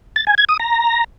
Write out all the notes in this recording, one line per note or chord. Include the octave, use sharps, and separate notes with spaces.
A6
G#5
G#6
D#6
A#5